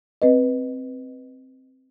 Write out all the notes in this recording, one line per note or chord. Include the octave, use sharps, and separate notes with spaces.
C4 B4 D#5